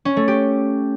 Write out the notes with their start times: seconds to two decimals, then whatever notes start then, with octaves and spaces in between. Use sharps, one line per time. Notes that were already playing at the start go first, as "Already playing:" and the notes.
0.05 C#4
0.17 A3
0.28 G4